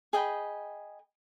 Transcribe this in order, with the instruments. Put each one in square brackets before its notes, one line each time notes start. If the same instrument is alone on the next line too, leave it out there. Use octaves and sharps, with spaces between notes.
[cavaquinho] G#4 D#5 G5 B5